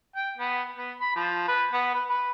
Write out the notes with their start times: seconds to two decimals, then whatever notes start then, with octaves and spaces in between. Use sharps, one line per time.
0.16 G5
0.38 B3
0.76 B3
1.01 B5
1.16 F3
1.48 B4
1.73 B3
1.94 B4
2.10 B4